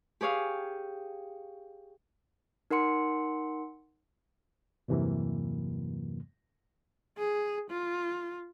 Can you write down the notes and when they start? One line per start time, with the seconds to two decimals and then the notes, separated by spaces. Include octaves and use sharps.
0.21 G4 G#4 C#5 F5
2.71 D#4 A#4 F#5 C6 C#7
4.88 E2 G2 C3 E3 F#3 A#3
7.18 G#4
7.70 F4